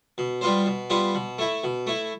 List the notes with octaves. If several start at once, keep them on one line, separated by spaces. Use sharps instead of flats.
B2
G3 B3 F4 C5
B2
G3 B3 F4 C5
B2
A3 E4
B2
A3 E4